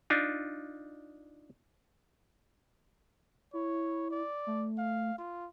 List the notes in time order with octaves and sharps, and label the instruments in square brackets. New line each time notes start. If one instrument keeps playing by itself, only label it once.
[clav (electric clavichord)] D4 D#4 F4
[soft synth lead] E4 [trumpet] C#5
[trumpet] D5
[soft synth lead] A3
[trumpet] F5
F4